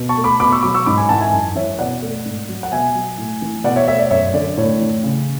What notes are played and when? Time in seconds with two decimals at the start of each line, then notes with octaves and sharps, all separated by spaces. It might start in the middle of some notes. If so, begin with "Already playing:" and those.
Already playing: B2
0.09 A5 C#6
0.17 A3
0.24 B5 D6
0.40 B2 B5 D6
0.52 C#6 E6
0.63 F#3 B5 D6
0.74 C#6 E6
0.86 G#2 B5 D6
0.97 G#5 B5
1.09 E3 F#5 A5
1.21 E5 G#5
1.32 F#2
1.55 E3 C#5 E5
1.79 B2 D5 F#5
2.02 A3
2.26 G#2
2.49 F#3
2.63 F#5
2.72 B2 E5 G#5
2.95 F#3
3.18 A2
3.42 E3
3.64 B2 D5 F#5
3.76 C#5 E5
3.88 A3 C#5 E5
3.99 D5
4.10 F#2 C#5 E5
4.34 D3 D5
4.57 A2 C#5
4.80 E3
5.03 C#3